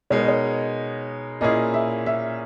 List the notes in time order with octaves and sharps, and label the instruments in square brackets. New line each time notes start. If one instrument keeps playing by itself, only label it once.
[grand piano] B2 G#3 D#4 A#4 [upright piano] C#5
[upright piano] D#5
C#5
[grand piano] A#2 A#3 C#4 E4 G#4 [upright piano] D#5
[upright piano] E5
E5